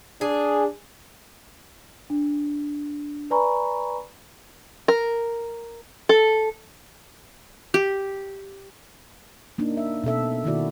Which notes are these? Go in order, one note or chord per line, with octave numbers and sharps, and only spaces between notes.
D4 G#4
D4
B4 D5 G#5 A#5 B5 C#6
A#4
A4
G4
A#3 D4 D#4
E5
B2 C4 A4 E5
B2 D#3 A#3 E4 F#4 D5